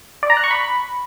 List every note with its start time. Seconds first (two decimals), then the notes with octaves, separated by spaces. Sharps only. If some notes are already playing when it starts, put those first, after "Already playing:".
0.23 D5
0.30 A#5
0.37 F#6
0.44 C#6
0.51 B5